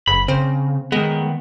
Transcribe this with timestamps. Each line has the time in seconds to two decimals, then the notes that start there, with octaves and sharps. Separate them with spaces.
0.07 F#1 B5
0.28 C#3 C4
0.92 D#3 G#3 B3